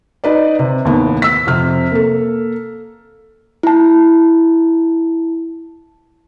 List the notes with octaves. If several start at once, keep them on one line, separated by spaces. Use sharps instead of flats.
D#4 B4 D5
C3
D#2 A2 B3
E6 B6
F2 C3 F6
A#3 A4
E4 A5